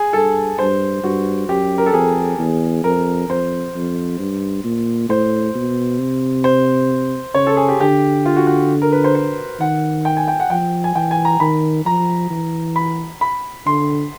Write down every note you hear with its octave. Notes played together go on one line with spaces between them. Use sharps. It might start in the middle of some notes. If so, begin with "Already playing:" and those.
Already playing: G#4
G2 A4
G2 C5
G2 F#4
F#2 G4
A#4
A4
F2 G#4
E2
F2 A#4
F2 C5
F2
G2
A#2
A2 C5
B2
C3
C5
C#3 C#5
A4
G#4
G4
D3 G4
F4
F#4
F#4
A#4
B4
C5
C5
D#3 F#5
G5
G#5
G5
F#5
F3 G5
G#5
E3 G5
G#5
A#5
D#3 B5
F3 A#5
E3
B5
B5
D3 C6